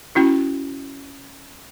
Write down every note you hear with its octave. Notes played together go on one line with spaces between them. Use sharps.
C#4 E4 F#4